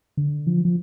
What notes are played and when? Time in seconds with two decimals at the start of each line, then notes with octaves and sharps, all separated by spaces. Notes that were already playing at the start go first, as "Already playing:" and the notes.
0.17 D3
0.47 F3
0.65 F3